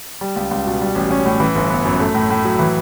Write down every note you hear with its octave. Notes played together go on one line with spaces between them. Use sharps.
G3
C#2
C#2
B2
G3
A1
C#4
A2
E3
G1
B3
F#2
A3
A2
A2
F#3
E3